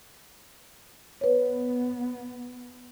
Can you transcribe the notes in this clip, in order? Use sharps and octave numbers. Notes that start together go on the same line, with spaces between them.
B3 B4 C#5